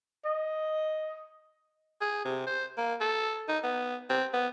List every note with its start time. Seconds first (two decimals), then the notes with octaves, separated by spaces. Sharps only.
0.25 D#5
2.01 G#4
2.25 C3
2.47 C5
2.78 A#3
3.01 A4
3.49 D#4
3.64 B3
4.10 C4
4.34 B3